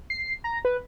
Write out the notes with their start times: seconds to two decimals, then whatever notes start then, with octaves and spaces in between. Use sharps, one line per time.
0.10 C7
0.44 A#5
0.65 B4